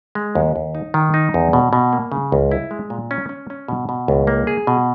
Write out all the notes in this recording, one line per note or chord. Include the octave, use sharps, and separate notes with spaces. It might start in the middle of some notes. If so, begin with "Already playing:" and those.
G#3
D#2
D#2
D#4
D#3
D#4
E2
B2
B2
A#3
C#3
C#2
E4
G#3
A#2
C#4
C#4
C#4
B2
B2
C#2
A#3
G#4
B2